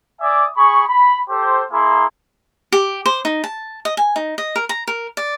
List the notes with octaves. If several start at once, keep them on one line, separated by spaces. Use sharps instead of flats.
D5 E5 G#5 D6 D#6
G#4 B5 C#6
B5
G4 A4 C5
A#3 E4 G#4 A#5 C6
G4
C5
D#4
A5
D#5
G#5
D#4
D#5
A#4
A#5
A#4
D5